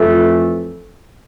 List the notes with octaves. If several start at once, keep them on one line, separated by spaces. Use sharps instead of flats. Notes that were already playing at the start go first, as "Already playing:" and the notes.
Already playing: F2 E3 A3